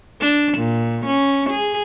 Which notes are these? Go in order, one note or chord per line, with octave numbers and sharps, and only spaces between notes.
D4
A#2
C#4
G#4